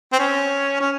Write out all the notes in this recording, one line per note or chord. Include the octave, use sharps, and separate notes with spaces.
C4
C#4
C#4